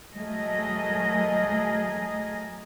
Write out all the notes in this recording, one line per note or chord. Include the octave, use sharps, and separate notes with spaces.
F#3 A3 G#4 A#4 D#5